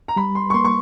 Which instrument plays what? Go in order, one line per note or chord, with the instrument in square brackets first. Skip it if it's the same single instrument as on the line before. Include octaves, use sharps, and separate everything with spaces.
[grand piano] A#5
[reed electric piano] G3 [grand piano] B5
[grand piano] C6
C#6
[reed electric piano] A#3 [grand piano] C6
[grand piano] C#6